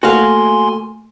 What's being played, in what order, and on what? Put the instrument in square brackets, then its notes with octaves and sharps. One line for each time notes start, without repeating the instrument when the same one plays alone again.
[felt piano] A3 A#3 [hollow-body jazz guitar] F#4 F5 [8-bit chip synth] G#5 C6